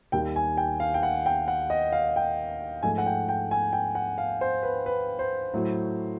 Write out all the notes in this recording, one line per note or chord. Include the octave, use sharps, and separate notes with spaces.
D#2 D#3 G3 A#3 G5
G#5
G5
F5
G5
F#5
G5
F#5
D#5
F5
G5
G#2 F3 A3 G#5
F#5
G5
G5
G#5
G5
F#5
F5
C5
B4
B4
C5
A2 F#3 A3